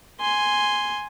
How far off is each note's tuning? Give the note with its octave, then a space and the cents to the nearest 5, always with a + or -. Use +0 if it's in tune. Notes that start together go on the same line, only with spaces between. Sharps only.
G#5 +0 C6 +0